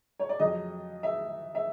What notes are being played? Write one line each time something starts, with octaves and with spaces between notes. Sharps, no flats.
C#5
D5
F2 C#3 F#3 D#5
E5
E5